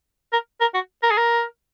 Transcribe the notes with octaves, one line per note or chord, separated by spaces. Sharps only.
A#4
A#4
F#4
A#4
G#4
A#4